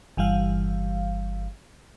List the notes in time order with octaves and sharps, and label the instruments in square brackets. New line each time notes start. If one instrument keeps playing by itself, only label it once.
[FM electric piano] G1 E3 G3 F5